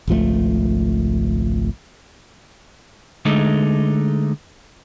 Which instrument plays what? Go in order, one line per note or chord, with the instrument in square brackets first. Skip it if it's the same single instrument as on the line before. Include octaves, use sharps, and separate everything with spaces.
[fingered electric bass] G#1 C#2 F3 A3
[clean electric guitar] D3 G#3 A3 D#4